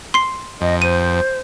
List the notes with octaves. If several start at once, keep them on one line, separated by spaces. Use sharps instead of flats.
C6 C7
F2 D#5
C5 D#7